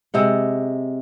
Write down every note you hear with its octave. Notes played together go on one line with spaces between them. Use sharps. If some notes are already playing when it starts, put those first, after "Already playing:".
C3 G#3 F#5